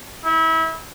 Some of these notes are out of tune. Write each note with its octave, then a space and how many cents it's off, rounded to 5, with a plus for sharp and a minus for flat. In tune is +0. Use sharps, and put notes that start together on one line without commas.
E4 -30